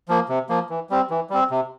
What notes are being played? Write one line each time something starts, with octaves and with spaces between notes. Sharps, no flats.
F3 A#3
C3
F3 A#3
E3
G3 C4
E3
G3 C4
C3